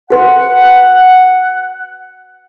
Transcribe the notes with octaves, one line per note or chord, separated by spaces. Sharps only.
F#4 B4 F#5 C6